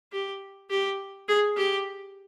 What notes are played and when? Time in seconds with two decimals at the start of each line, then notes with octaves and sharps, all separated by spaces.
0.12 G4
0.70 G4
1.28 G#4
1.57 G4